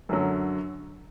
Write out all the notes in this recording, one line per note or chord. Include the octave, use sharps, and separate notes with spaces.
F#2 D3 F#3